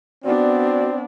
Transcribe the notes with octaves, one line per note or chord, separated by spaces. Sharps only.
B3 C4 D4 F#4 D5